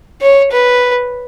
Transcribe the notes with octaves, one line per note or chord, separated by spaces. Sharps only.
C#5
B4